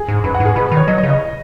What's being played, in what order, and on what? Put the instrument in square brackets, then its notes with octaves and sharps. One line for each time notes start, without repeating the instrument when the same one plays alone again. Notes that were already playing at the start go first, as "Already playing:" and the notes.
Already playing: [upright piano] G#4
[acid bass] G#2
[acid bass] F#2 [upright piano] B4
[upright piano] F#5
[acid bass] G#2
[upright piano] G#4
[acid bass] B2 [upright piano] B4
[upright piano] B4
[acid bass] D#3
[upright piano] C#5
[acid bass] F#3 [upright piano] D#5
[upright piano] D#5
[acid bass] C#3
[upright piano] D#5